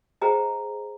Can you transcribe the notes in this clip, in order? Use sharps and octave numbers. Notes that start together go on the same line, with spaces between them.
G#4 C5 D#5 G5 A#5